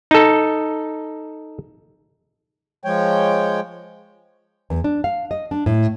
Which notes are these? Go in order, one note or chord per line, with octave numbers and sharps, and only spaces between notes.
D#4 A4
F3 G#3 C#5 G5
E2
D4
F5
D#5
D4
A2